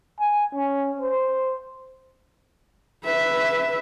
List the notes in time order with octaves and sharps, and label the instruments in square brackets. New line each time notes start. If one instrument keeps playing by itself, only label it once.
[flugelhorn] G#5
C#4
C5
[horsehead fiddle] B4 E5